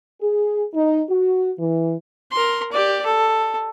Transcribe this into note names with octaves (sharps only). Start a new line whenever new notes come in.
G#4
D#4
F#4
E3
A#4 C6
G4 D5
A4